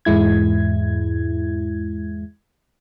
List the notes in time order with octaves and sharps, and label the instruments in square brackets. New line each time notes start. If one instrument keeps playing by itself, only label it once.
[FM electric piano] E2 G#2 G#3 E4 G#6